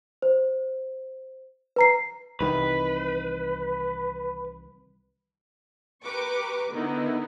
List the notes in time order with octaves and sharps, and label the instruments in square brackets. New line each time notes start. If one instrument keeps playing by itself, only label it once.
[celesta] C5
B4 A#5 C7
[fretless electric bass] C2 D#3 E3 [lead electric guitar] B4
[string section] G4 A#4 B4 C#6 D6
D3 D#3 B3 D#4 E4